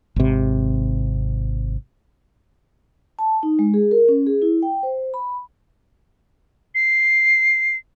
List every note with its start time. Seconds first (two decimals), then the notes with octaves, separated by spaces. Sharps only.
0.16 G#1 C3
3.19 A5
3.43 D#4
3.59 G#3
3.74 G#4
3.91 A#4
4.09 C#4
4.27 G#4
4.42 E4
4.63 G5
4.83 C5
5.14 B5
6.75 C7